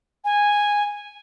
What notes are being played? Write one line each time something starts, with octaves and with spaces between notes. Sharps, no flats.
G#5